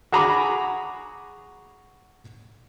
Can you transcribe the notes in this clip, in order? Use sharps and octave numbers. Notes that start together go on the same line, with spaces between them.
F#4 G#4 A#5 B5 D6